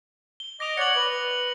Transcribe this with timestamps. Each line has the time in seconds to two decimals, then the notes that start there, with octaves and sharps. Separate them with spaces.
0.40 G7
0.60 D#5 D6 A#6 F7
0.77 C#5 D5 F#5 C#7 F#7
0.96 B4